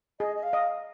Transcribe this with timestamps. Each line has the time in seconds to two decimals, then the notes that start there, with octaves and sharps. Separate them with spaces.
0.20 G#4 D#5
0.35 D#5
0.42 F5
0.53 D#5